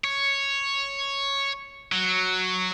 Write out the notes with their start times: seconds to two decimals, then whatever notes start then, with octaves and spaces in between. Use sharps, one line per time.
0.04 C#5
1.92 F#3